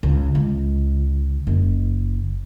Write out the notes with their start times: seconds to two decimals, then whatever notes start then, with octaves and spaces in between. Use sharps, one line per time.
0.03 C#2
0.35 C#2
1.47 F#1